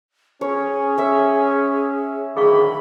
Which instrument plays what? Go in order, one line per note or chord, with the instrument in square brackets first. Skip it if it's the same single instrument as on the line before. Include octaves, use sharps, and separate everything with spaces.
[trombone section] C#4 [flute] G#4 [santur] C#5
[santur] C#5 E5
[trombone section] D2 A2 D#3 [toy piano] G#4 F5 C#6 [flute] B5